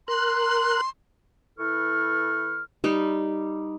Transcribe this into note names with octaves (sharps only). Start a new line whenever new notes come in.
A#4 C6 F#6
E3 E4 A4 B4 C#6 F6
G3 D#4